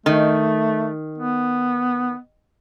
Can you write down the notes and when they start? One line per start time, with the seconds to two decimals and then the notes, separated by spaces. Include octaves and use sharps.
0.06 D#3 A3
1.18 B3